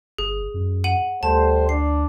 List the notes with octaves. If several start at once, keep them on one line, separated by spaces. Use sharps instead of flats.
G1 G#4
F#2
F#5 D#7 F#7
D2 G3 A3 C5 A5
D4 C7